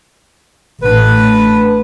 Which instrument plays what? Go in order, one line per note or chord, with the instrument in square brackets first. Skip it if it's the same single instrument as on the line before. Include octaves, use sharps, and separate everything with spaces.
[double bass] A1 A2 [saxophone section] D3 B4